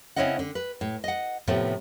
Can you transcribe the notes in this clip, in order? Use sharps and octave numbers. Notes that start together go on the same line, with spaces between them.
C#3 C4 C#4 E4 D#5 F#5
D3
B4
A2
D#5 F#5
A2 C3 F3 A3 B3